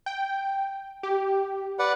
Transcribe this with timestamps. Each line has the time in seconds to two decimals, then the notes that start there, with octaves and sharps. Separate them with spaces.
0.06 G5
1.03 G4
1.79 B4 D5 F#5